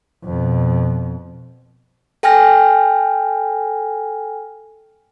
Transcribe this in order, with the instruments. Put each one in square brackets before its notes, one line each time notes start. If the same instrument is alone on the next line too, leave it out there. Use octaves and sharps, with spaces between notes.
[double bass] F2 B2
[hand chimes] A4 G5 G#5 F6 A#6